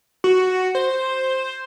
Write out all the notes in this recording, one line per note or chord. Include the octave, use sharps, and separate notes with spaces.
F#4
C5